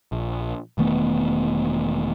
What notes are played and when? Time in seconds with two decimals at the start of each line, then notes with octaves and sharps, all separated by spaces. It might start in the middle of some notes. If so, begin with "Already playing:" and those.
0.12 A#1
0.78 E1 D#3 A3 B3